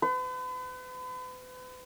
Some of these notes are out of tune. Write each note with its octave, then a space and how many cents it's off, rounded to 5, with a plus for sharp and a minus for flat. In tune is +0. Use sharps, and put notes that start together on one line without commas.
B4 +40